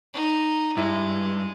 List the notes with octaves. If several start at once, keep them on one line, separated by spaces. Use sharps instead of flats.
D#4
G2 G#3 E4